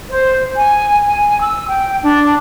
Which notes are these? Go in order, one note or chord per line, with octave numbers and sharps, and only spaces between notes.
C5
G#5
G#5
E6
G5
D4